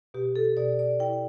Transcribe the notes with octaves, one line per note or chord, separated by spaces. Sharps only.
B2 G4
A4
B2 D5
D5
E4 G5